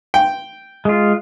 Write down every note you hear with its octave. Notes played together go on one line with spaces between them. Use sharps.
G5
G#3 F4